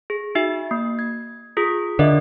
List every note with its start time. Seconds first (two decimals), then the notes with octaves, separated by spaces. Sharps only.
0.10 G#4
0.35 D#4 F#4 E5
0.71 A#3
0.99 G#6
1.57 F4 G#4 D#6
1.99 D3 A#4 D#5 E5